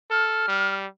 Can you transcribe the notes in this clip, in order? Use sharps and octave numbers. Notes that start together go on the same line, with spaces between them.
A4 F6
G3